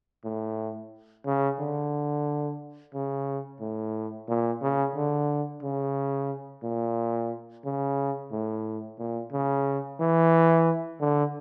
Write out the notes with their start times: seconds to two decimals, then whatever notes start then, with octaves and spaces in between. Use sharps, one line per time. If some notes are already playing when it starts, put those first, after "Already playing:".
0.25 A2
1.26 C#3
1.59 D3
2.94 C#3
3.60 A2
4.28 A#2
4.62 C#3
4.95 D3
5.63 C#3
6.63 A#2
7.64 C#3
8.31 A2
8.99 A#2
9.32 C#3
10.00 E3
11.00 D3